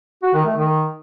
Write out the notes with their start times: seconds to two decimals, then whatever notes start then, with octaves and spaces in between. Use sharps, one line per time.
0.23 F#4
0.34 D#3
0.45 A3
0.56 D#3